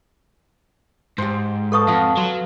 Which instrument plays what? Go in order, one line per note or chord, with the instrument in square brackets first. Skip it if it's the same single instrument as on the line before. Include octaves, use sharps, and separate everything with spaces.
[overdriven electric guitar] G#2 [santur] G4 C5
[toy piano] A4 C#6 D#6 [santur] B4 F5 A5
[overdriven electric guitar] F2 [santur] F4 F5 F#5
[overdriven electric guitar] F#3 [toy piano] C6